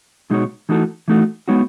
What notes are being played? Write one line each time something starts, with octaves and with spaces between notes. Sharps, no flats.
B2 G#3 D#4 F#4 C#5
E3 A3 D#4 F#4 A4
E3 A3 D#4 F#4 A4
G#3 B3 D#4 F#4 C#5